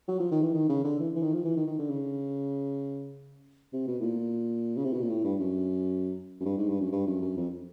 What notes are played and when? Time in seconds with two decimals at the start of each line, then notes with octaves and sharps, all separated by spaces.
0.08 F#3
0.20 F3
0.31 D#3
0.42 E3
0.54 D#3
0.69 C#3
0.84 D3
1.00 E3
1.15 E3
1.23 D#3
1.33 F3
1.45 E3
1.57 D#3
1.67 D#3
1.79 D3
1.90 C#3
3.73 C3
3.87 B2
4.00 A2
4.03 A#2
4.77 C#3
4.84 C3
4.93 B2
5.01 A#2
5.10 A2
5.24 G2
5.40 F#2
6.40 F#2
6.45 G2
6.57 G#2
6.69 G2
6.80 F#2
6.92 G2
7.07 F#2
7.22 F#2
7.37 F2